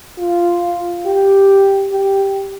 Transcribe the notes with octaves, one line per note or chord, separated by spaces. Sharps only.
F4
G4
G4